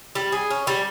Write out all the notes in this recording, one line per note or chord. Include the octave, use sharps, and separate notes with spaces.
G3
G#4
C#4
G3